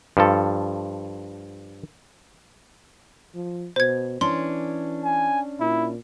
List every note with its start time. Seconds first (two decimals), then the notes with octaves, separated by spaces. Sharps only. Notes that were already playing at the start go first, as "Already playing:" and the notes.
0.17 G2 F3 A4
3.35 F3
3.76 B2 C5 G#6
4.21 E3 C#4 D4 C6
5.05 G#5
5.60 A#2 E4